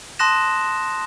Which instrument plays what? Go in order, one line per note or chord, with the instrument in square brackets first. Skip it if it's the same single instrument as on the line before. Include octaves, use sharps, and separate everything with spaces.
[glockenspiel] A5 C6 D#6 F#6 A#6 E7